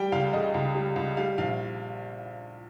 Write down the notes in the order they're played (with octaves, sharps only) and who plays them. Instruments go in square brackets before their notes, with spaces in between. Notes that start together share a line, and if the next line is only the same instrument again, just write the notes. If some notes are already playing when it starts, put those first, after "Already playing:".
Already playing: [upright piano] G3 G5
C#2 F5
C#3 D#5
C#2
G3
C#2
G3 F5
A#1 F5